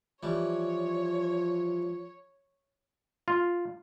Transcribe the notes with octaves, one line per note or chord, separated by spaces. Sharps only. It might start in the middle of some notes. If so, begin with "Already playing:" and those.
E3 F3 G3 C#5
F4